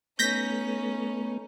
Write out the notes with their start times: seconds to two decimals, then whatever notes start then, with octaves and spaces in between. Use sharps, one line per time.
0.19 A3 B3 C#4 D#4 G6 A#6 B6